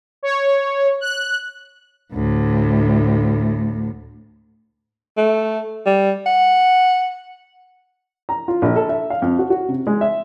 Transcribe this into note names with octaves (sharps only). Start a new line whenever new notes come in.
C#5
F#6
D2 A2
A3
G3
F#5
A#5
F4
A#1
A4
E5
F5
F2
F#4
F#4
C3
G#3
E5